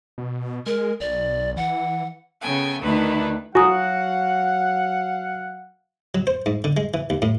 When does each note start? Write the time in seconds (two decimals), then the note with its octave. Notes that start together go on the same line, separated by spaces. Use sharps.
0.18 B2
0.66 G#3 A#4
1.00 B1 D5
1.57 E3 F#5
2.41 C#3 B3 A4 G5 G#5
2.83 D2 D#3 A3 D4 E4 B4
3.55 F#3 F#4 F5 F#5 G#5 A#5 D#6
6.15 F#3
6.27 C5
6.46 G#2
6.64 D3
6.77 G#3
6.94 E3
7.10 D#2
7.22 A2